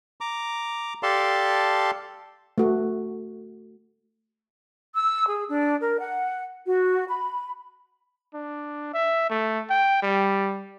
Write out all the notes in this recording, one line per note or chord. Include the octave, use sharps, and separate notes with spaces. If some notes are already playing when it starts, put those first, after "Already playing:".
A#5 D6
G4 A4 D5 F5 A5 C6
A3 F#4
E6
G#4
D4
A#4
F#5
F#4
B5
D4
E5
A3
G5
G3